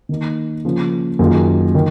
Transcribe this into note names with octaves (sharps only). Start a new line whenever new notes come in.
D#3 A#3 D#4
C#3 F3 A#3 C#4
F#2 D#3 A#3 F4 G#4
D#3